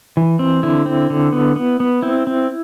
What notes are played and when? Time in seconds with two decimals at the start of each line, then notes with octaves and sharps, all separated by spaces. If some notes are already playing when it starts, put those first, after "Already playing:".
0.17 E3
0.39 C4
0.63 D3 E4
0.86 C4
1.10 D3
1.33 B3
1.56 B3
1.80 B3
2.02 C4 E4
2.27 C4